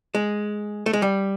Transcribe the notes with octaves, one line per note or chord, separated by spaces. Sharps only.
G#3
A3
G#3
G3